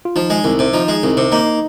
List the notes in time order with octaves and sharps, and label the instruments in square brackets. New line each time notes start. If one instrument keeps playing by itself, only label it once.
[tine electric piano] F4
[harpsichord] F3 [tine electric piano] D#4
[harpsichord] G#3
C2
C3
[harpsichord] F3 [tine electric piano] D#4
[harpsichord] G#3
C2
C3
[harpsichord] A#3 [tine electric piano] D#4